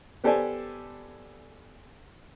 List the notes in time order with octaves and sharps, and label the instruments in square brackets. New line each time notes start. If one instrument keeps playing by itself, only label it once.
[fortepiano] B3 G4 A4 C5 D5 G#5